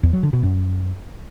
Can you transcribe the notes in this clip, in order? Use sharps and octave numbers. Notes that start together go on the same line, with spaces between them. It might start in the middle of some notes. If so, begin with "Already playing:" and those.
E2
F#3
D3
B2
F#2